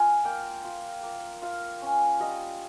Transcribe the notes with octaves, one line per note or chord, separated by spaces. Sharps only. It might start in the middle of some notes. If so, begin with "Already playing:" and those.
Already playing: F4 F5 G#5
A#3 G5
F4
A#3
F4 F5
C#4
G3 D#5